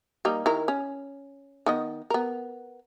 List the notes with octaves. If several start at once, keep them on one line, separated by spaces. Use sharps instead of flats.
G3 A#3 D#4
D#3 E4 A#4
C#4
D#3 B3 D#5
B3 A#4